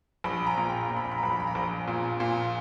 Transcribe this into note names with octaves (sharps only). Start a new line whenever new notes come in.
A#1 B5
A#5
A#2
G5
A#2 A#5
B5
A#5
B5
A#5
A#1 B5
A#5
B5
A#5
A#1
A#2
A#2